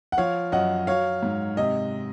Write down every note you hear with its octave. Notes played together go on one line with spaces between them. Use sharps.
F#5
F3 C#5 F5
F#2 D#5 F#5
F#3 C#5 F5
G#2
C3 D#5